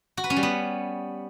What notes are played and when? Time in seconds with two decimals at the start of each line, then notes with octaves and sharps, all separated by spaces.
0.17 F#4
0.24 B4
0.30 C#4
0.36 G3
0.43 B3